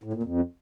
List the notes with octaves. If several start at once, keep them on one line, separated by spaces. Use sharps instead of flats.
A2
A#2
F2